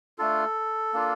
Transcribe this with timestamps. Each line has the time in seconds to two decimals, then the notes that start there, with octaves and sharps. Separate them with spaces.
0.18 A3 D4 F4 A4
0.94 A#3 D4 F4